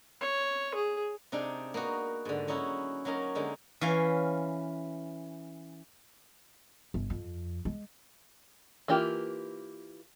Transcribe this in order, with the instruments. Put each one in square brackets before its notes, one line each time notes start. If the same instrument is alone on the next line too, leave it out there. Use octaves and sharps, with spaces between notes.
[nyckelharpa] C#5
G#4
[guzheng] C3 D4 D#4 G#4
A#3 B3 D#4 F#4
G#2 D3
F#3 C#4 D#4 E4 F#4
F#3 A#3 C#4 D#4 A#4
D3 G#3 A#3 D#4
E3 C#4 F5
[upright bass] G1
F2
G#3
[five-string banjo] E3 A#3 F4 G4